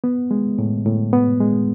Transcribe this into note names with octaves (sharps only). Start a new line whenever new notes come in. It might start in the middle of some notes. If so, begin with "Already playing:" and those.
B3
G#3
A2
A2
B3
G#3